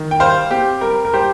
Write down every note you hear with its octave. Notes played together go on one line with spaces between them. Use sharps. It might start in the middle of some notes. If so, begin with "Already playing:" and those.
Already playing: D#3
G5
G3 C5 F5
C4 G4
G3 A#4
A#4
G3 G4 C5